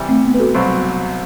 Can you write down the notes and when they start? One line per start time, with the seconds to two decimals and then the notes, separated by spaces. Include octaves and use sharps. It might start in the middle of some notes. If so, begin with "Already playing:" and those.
Already playing: C3 E3 G3
0.09 A3 C4
0.25 B3
0.34 B4
0.39 F#4 A4
0.54 C2 B2 F#3 C4